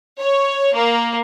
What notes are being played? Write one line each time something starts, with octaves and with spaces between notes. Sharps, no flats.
C#5
A#3